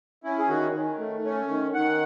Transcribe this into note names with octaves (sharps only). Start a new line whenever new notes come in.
C#4 E4
G#4
D#3 F#4
D#3
A3
C#4
D#3
D#3 F#5